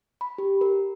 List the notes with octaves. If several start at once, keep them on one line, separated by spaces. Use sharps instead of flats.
B5
G4
A#4